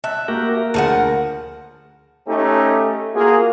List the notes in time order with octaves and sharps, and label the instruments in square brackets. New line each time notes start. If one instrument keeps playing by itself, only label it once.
[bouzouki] E5 [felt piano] A5 F#6
[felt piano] A#3 [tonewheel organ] F#4 G4 A#4
[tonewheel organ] A#4
[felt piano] D2 A5 [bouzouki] C#3 F3 F#5
[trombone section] A3 C#4 D#4 G4 A4
A#3 F4 F#4 G#4